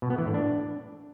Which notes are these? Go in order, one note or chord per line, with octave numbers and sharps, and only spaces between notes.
B2
B3
E3
A2
D4